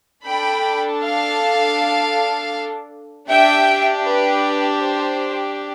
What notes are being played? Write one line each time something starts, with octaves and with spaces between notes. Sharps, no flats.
D4 A4 G5 B5
F5 A5
D4 G4 E5 G5
B4
C5